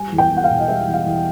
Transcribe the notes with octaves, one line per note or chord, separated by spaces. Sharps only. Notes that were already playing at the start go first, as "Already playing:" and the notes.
Already playing: G3 G#5
E2
G5
E2
F#5
F5
B2
D#5
G3 E5
E2
F5
E2